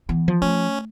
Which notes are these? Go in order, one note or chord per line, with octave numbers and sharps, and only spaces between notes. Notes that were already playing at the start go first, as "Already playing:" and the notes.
E3 B3
F3
A3 C#4